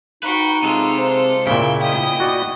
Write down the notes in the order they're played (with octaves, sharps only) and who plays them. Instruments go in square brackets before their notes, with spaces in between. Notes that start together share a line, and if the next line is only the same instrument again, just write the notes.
[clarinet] D#4 [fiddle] F#4 G5 [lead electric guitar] B4
[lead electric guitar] C3 G#3 [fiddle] F4 A4
[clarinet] C5
[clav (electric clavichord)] A#2 C#3 [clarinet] A#3 [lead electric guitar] E4 [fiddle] G5
[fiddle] D#5 D#6 [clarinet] G5
[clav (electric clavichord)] F#4 D5